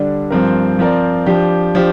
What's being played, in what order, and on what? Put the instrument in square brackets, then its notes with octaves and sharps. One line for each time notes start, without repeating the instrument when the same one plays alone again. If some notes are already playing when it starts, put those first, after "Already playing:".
Already playing: [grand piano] D3 G3 D4
G2 F3 C4 A#4
F3 C4 A#4 D5
F3 D4 G4
F3 D4 G4